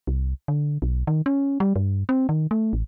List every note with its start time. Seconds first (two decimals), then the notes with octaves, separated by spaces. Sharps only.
0.07 C2
0.48 D3
0.82 B1
1.07 D#3
1.26 C#4
1.60 G3
1.76 G2
2.09 C4
2.29 D#3
2.51 A3
2.73 A1